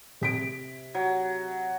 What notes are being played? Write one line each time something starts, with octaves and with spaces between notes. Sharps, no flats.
C3 B6 D7
F#3